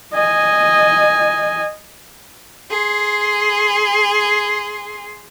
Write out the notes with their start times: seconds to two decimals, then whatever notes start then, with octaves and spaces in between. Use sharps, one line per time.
0.13 D#5 G#5
2.70 G#4 C6